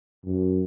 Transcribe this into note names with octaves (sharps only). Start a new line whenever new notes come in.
F#2